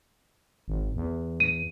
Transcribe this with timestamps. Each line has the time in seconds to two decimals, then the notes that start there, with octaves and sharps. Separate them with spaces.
0.68 G#1
0.96 E2
1.40 D#7